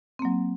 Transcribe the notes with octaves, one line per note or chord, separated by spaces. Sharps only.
F#3 A#3 C4